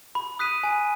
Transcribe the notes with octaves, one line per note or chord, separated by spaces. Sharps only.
B5
D#6 F#6 B6 D#7
G#5